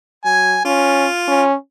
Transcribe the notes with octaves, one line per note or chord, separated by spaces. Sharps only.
F#3 G#5
C#4 F4
C#4